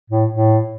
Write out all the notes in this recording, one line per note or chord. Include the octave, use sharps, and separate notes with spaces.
A2
A2